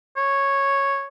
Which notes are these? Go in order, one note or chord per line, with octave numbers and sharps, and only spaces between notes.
C#5